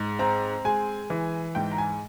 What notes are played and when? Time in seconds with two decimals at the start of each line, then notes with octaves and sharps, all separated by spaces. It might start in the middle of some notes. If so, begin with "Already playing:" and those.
Already playing: G#2
0.19 C4 A#5
0.64 G#3 G#5
1.10 E3
1.55 G#2 G5
1.72 A#5
1.78 G#5